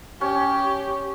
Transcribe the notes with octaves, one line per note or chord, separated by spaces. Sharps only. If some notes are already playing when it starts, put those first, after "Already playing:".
C#4 G4